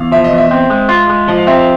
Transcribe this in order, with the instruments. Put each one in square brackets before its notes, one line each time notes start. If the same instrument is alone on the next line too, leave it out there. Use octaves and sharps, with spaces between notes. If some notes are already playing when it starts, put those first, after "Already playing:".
Already playing: [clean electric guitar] E2 [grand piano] F5
[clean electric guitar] F3 [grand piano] E5
[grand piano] D#5
[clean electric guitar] E2
[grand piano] E5
[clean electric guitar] C4
G#3
F4
G#3
[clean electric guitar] F3 [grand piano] D#5
[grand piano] F5
[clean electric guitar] C4 [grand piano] E5
[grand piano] F5